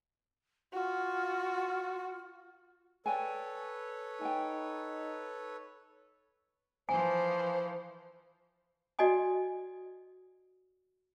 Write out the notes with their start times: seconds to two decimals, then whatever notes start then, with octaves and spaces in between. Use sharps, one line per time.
0.73 F4 F#4
3.06 A4 B4 C#5 D5 G5 G#5
4.21 D#4 G5 G#5
6.89 E3 F3 C5 G#5
8.99 F#4 D5 D#5 G#5 D#6